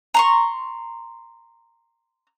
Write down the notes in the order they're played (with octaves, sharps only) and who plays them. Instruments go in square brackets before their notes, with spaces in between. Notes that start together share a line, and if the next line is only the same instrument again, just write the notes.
[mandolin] A#5 C6 C#6